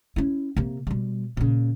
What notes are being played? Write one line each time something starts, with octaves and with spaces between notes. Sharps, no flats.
C#4 E4
C3 A#3
B2 G3
A#2 C#3